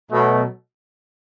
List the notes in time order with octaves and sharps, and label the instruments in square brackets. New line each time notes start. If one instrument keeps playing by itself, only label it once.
[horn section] B2 F#3 A3